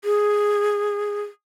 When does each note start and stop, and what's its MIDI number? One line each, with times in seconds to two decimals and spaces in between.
0.05 1.22 68